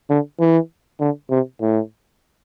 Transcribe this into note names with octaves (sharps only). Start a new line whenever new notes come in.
D3
E3
D3
C3
A2